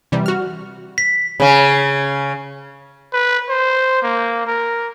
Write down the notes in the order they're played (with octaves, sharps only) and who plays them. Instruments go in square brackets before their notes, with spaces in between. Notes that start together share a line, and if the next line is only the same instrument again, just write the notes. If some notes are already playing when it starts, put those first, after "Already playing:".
[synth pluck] C3 E3 G3
F#4 F6
[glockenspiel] B6
[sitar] C#3 C#4
[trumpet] B4
C5
A#3
A#4